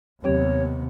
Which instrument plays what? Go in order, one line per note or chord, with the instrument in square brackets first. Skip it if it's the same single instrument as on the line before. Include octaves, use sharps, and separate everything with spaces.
[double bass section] D#2 [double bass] C3 B3 [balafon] F#3 C4 G4 [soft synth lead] C#5